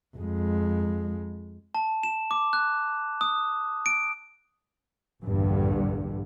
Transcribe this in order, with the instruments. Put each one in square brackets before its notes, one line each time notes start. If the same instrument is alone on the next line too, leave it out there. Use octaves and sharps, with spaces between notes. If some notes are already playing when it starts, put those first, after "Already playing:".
[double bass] F2 G#3
[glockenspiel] A5
E7
D6
F#6
D#6
D7
[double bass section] A#1 E2 G2 D3